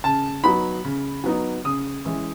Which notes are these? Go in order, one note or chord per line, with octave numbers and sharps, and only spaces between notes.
C#3 A5
F#3 B3 D#4 B5
C#3
F#3 B3 D#4
C#3 D#6
E3 G#3 C#4 E4